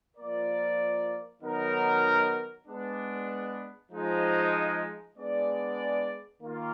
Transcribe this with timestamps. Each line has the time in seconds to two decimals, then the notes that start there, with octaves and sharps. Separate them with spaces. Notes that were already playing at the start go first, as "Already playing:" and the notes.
0.16 F3 A#3 F4 A#4 D5
1.41 D#3 F#3 B3 D#4 A#4
2.66 G#3 B3 D4
3.91 F3 G#3 D#4
5.16 G#3 B3 D4 G#4 D5
6.41 D#3 A#3 F4